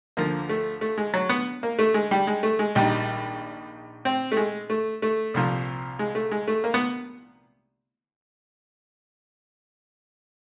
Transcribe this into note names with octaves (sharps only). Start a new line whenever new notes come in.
D2 D3 F3 A#3
A3
A3
G#3
F#3
B3
A#3
A3
G#3
G3
G#3
A3
G#3
A#1 G#2 D#3 G3
C4
A3
G#3
A3
A3
C2 A#2 F3
G#3
A3
G#3
A3
A#3
B3